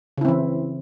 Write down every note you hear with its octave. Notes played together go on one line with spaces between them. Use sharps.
C#3 E3 C4 E4